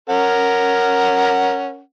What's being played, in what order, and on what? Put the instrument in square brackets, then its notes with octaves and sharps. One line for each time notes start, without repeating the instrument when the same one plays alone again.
[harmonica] C#4 A#4 F#5